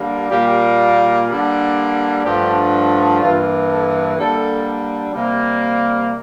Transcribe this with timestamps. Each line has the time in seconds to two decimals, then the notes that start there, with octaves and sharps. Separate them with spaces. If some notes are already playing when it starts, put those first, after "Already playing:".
Already playing: D3 G3 A#3
0.30 A#2 G3 A#3 G4
1.27 D3 G3 A#3
2.24 G2 D3 F3 A3 G4
3.20 G2 E3 A#3 F4
3.69 A4
4.17 D3 G3 A#3 A4
5.14 C3 G3 A#3